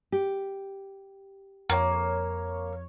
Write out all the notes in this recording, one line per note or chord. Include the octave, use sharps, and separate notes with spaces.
G4
F2 A#3 C#5